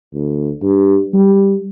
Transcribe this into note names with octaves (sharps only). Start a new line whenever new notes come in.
D2
G2
G3